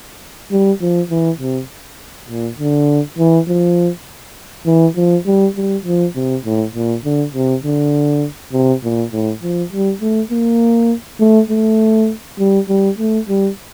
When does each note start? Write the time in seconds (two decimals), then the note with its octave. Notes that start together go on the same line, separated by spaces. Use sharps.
0.51 G3
0.81 F3
1.10 E3
1.40 C3
2.29 A#2
2.59 D3
3.19 E3
3.48 F3
4.66 E3
4.96 F3
5.26 G3
5.56 G3
5.85 F3
6.15 C3
6.45 A2
6.75 A#2
7.05 D3
7.34 C3
7.64 D3
8.53 C3
8.83 A#2
9.12 A2
9.42 F3
9.72 G3
10.01 A3
10.31 A#3
11.20 A3
11.50 A3
12.39 G3
12.69 G3
12.98 A3
13.29 G3